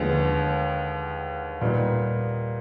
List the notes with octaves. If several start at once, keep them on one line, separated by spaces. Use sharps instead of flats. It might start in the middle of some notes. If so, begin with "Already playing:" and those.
Already playing: D#2 D3 F3 G#3 B3
A#2 G3 B3 D#4